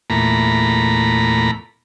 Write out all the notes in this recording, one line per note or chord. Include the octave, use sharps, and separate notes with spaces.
E2 A#2 A3 A#5 B5